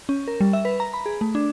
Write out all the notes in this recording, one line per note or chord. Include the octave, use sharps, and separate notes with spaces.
C#4
A#4
G3
E5
B4
A#5
B5
G#4
A3
D4